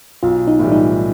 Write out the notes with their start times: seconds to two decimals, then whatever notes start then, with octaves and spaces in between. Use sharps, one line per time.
0.23 B1 F4
0.47 D#4
0.59 A2 E3 G3
0.72 D#4